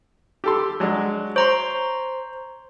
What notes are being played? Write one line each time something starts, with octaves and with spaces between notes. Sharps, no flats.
G4 A4 C6
F#3 G#3 D4
C5 C#5 A#5 C6